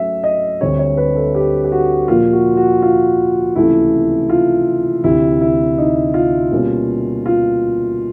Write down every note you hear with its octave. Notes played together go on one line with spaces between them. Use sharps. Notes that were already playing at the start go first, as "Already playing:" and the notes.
Already playing: F#3 A3 C#4 E5
D#5
D2 D3 G3 C4 C#5
C#5
B4
A4
G4
G4
F#4
A#2 F3 A#3 F4
F#4
F#4
F4
C#2 C3 E3 A3 E4
F4
D2 C3 E3 E4
E4
D#4
F4
B2 G3 A#3 C#4
F4